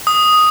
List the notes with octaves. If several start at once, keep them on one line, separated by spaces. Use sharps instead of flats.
D#6